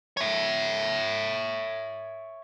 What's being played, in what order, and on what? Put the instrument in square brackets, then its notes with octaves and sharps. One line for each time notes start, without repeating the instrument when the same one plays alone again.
[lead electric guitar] C#5 E5